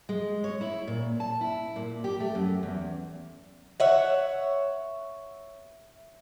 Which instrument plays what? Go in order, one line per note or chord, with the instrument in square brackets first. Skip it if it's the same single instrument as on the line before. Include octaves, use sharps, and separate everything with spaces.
[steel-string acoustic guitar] G#3
C#5
E4
A#2
A5
E4
A#2
G4
A3
F#2
E2
[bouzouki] C#5 E5 F#5